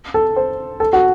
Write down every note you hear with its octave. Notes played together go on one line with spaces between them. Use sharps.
A4
C5
A4
F#4